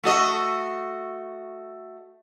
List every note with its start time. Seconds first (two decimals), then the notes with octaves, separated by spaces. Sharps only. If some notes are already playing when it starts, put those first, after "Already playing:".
0.04 A3 F#4 D#5